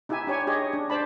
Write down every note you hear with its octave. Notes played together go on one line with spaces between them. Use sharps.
D#4 E4 G4 E5 G#5
D4 G4 C#5 G#5
G4 G#4 C#5 D#5
D4
C5 D5 A5 B5